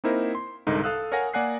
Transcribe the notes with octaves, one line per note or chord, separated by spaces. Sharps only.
A#3 C4 D#4 E4 A#4 C5
C6
C2 G#2 D3 D#4 A#4
A4 F5 D#6 E6 F#6
A#4 C#5 F5 F#5 G#5 A#6
A#3 D5 F#5 G#5 F#6 C7